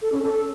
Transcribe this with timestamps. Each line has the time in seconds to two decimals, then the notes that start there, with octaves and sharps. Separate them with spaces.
0.02 A4
0.12 C#4
0.22 A4